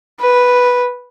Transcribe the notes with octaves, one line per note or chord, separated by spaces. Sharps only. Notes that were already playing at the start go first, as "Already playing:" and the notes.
B4